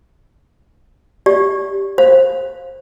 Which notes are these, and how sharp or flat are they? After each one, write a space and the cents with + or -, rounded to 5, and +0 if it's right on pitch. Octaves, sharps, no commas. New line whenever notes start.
G4 +0 D5 -35
C5 +20 F5 +10